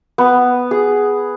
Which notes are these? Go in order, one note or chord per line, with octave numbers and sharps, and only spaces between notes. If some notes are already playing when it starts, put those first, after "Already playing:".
B3
G#4